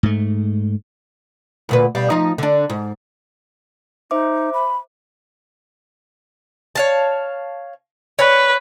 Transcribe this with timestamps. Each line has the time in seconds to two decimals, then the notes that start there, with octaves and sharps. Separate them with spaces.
0.03 G#2 A3
1.69 D2 A#2 B4
1.95 B2 G3 F5
2.10 F3 D#4
2.38 D3 D4
2.70 G#2
4.11 D#4 C5 E5 D6
4.53 B5
6.76 C#5 F5 A5
8.19 B4 C#5